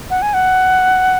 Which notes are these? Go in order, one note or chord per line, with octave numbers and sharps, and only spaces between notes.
F#5
G#5
F#5